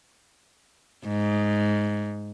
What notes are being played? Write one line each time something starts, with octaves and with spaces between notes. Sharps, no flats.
G#2